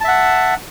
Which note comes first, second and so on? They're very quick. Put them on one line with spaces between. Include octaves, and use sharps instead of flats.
A5 E5 F#5